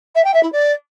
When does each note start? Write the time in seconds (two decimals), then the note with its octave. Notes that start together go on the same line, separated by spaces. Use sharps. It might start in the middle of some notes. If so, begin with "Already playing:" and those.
0.15 E5
0.24 G5
0.33 E5
0.43 E4
0.52 D5